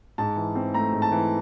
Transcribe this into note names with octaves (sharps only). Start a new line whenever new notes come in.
G#2 A5
E3
C4
A3 A#5
G#2
A5
E3